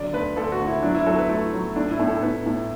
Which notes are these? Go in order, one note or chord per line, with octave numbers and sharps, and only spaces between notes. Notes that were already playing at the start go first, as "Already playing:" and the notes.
Already playing: D3 F#3 D5
D2 B4
D2 A4
F#4
D2
E4
F#3 D4
E4
F#3 A4
B4
A3 E4
F#3
A2 D4
E4
A2
A4
A2 B4
A2